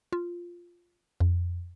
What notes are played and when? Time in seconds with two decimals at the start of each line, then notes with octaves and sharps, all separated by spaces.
0.13 F4
1.20 F2